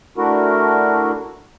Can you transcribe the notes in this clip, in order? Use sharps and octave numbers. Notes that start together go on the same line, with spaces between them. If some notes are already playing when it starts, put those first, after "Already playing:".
A3 D4 E4 F#4 A#4